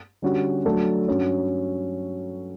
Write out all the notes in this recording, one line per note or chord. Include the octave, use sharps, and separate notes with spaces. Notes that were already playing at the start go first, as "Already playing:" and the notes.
D3 G3 C#4 F#4
F#3 A3 D4 A4
G2 F#3 C#4